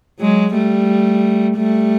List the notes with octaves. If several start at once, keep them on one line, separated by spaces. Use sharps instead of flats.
F#3 G#3
G3 A3
G3 A3